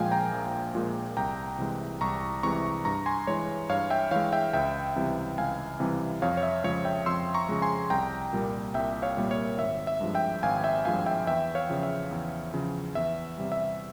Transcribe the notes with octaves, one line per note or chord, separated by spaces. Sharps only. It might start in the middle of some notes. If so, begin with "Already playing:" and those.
Already playing: A#1 A#2 F3 G#3 F5 G5 G#5
G5 A#5
A#1
A#2 F3 G#3
C2 G5 A#5
C3 E3 G#3
C2 A#5 C#6
C3 E3 G#3 A#5 C#6
G2 A#5 C#6
G#5 C6
E3 G#3 C#5
G2 C#5 F5
E5 G5
E3 G#3 C#5 F5
E5 G5
C#2 E5 G5
C3 E3 G3
C#2 F5 G#5
C3 E3 G3
F2 C#5 F5
C#5
E5
C#3 F3 G#3 C#5 F5
E5 G5
F2 C6 E6
A#5 C#6
C#3 F3 G#3
G#5 C6
C2 G5 A#5
A#2 G3 A#3
C2 E5 G5
C#5 F5
A#2 G3 A#3
C#5
G#1 E5
E5
G2 F3 G#3
E5 G5
G#1 F5 G#5
E5 G5
G2 F3 G#3 F5 G#5
E5 G5
E2 E5 G5
C#5 F5
C#3 F3
E5
E2
C#3 F3
E2 E5
C3 G3
E5